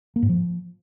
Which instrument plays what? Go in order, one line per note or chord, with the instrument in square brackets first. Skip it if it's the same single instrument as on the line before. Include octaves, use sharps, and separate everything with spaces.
[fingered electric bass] A#3
G#2
F3